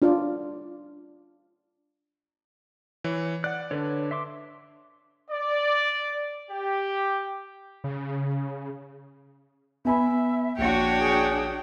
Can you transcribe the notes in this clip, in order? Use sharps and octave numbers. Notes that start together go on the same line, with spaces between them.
D4 F4 D5
E3 C#5
D5 F#5 F#6
D3 D4 B4 C#5
E5 C6 D6
D5
G4
C#3
B3 E5 G#5 B5
A#1 D4 F#4 C#5 G5
G#4